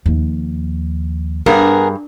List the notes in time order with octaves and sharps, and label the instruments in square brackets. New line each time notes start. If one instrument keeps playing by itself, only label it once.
[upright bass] D#2 F3
[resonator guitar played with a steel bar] G2 [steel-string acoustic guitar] B3 G#4 A#4